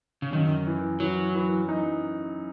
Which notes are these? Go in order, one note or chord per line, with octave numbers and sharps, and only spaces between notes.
C#3
F#2 D#3
E3
E3 F#3
E3
D#4